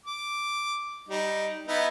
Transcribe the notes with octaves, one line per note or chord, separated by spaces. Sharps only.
D6
G3 D#4
B3 D#4 E4